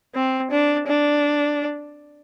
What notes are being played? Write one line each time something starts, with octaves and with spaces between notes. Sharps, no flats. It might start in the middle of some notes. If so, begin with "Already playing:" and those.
C4
D4
D4